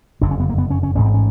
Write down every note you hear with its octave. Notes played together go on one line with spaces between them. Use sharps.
F#1 F2 D3 D4
C#4
B3
A#3
B3
C#4
C#4
A1 G#2 C#4
C4
C#4